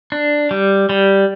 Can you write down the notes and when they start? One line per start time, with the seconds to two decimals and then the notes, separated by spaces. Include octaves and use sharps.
0.12 D4
0.51 G3
0.89 G3